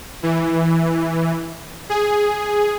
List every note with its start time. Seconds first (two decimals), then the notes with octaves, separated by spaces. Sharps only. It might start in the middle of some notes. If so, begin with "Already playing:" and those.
0.23 E3
1.90 G#4